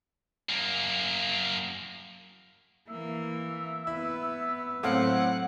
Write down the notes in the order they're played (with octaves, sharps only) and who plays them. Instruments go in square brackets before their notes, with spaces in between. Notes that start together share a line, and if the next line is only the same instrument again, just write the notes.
[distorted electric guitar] F#2 A#3
[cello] E3 A#3 [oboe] E5
[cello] B3 B4 [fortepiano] E4
[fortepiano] A2 C4 F5 [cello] F#3 [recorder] F#5